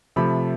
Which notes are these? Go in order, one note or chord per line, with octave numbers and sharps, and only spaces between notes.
C3 F3 A3 B5